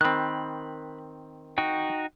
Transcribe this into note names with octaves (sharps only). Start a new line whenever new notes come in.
D#3 C4 B5 F#6
D#4 F#4 G5